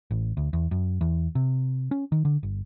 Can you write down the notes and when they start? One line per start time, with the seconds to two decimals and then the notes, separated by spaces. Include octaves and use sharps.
0.11 A1
0.37 D2
0.53 E2
0.71 F#2
1.01 E2
1.35 C3
1.91 C#4
2.12 D#3
2.25 D3
2.43 G1